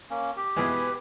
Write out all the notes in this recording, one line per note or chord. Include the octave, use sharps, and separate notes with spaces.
A#3 C#4
G4
B2 E3 G#3 B4